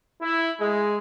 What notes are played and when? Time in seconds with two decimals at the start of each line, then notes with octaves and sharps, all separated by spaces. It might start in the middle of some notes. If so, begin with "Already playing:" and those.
0.21 E4
0.59 G#3